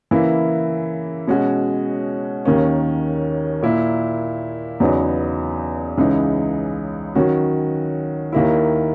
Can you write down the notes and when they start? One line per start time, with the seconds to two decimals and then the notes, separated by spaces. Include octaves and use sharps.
0.11 C#3 E3 A#3 E4
1.27 B2 G#3 C#4 F#4
2.45 D#2 D#3 A#3 C#4
3.63 A#2 A#3 E4
4.80 E2 C#3 F#3 B3 D#4
5.97 C#2 C#3 E3 G#3 D#4
7.15 D#3 F#3 C#4 F#4
8.33 D#2 D#3 A#3 E4